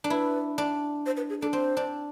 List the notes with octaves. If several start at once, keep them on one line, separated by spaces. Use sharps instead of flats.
D4
E4 B4
D4
C5
B4
G#4
D4 A4
C4 C5
D4